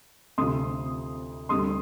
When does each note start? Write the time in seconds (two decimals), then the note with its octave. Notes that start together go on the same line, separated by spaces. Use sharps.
0.38 D2 C3 F3 C6 D#6
1.49 D2 D3 G3 C6 D#6